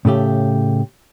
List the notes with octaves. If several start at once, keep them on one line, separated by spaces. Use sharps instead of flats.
A2 C#3 A3 G4